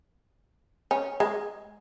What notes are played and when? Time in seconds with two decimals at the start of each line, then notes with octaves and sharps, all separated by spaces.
0.91 C#4
1.20 G#3